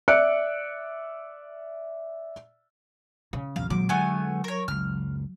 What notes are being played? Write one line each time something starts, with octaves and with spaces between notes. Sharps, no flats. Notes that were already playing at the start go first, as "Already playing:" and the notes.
D5 E5 F#6 C#7 D7
C#3
A#1 E2 F#3 F5
A#2 D#3 F#3 G#3 D6
D3 G#3 A3 B3 G#5
A#4 C#5
F#1 C#2 F6